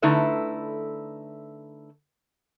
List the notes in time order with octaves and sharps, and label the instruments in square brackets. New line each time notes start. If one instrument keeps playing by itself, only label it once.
[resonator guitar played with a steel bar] D3 A3 D#4 E4 A4 B4